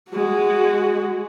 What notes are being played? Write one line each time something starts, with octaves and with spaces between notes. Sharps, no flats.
G#3 F#4